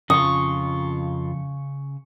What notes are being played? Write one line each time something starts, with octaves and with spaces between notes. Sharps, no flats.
F2 C#3 F4 C#6 D#6